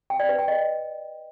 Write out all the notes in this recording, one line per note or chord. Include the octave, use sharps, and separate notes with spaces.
G5
D5
B4
G5
D#5